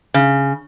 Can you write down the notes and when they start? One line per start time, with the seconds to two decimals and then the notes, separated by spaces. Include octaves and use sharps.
0.14 C#3